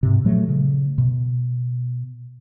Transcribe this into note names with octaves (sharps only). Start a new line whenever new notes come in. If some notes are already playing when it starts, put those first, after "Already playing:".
G#2 C3
A#2 F3 F#3 A3
C#3
B2